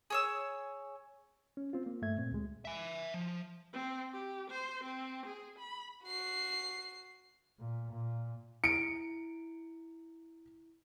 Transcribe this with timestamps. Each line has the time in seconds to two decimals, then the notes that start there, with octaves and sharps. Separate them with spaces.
0.10 G#4 C#5 E6
1.57 C#4
1.73 C4 F4
1.86 A#3
2.02 G2 A3 E5 G#6
2.18 A#2 C4
2.31 D2 G#3
2.65 E5 G#5
3.14 F3
3.73 C4
4.12 G4
4.50 C5
4.84 C4
5.26 G#4
5.58 B5
6.04 F#4 C7
7.59 A#2
7.92 A#2
8.64 E4 C#7 D7